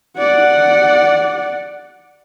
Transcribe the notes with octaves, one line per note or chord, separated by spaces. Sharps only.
D5 F#5